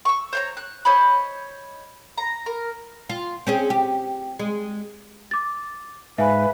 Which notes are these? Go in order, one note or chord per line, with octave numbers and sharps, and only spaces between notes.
C#6 E6
C5 C#5 A#5
F#6
C5 C#5 D#5 B5
A#5
A#4
F4
C4 C#4 G#4
G4
G#3
D6 A6
G#2 B4 E5 F5 G#5